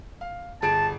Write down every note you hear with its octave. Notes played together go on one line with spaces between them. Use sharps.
F5
G1 G#4 A5 D7